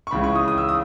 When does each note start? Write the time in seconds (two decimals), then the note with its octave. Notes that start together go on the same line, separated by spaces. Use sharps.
0.07 C#6
0.11 C#2 C#3 E3 B5
0.24 C#6
0.35 D#6
0.48 D#6
0.58 E6
0.69 D#6